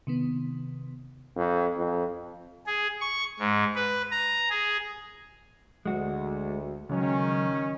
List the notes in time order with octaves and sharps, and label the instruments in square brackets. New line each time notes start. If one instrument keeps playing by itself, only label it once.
[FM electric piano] C3 D#3 B3
[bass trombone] F2
F2
[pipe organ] G#4
C#6
G#2
B4
A#5
G#4
[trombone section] D2 [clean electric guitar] G#3 F#4
[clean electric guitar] C#2 F#3 [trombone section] D#3 C#4